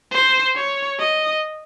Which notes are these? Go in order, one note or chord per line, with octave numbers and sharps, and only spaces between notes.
C5
C#5
D#5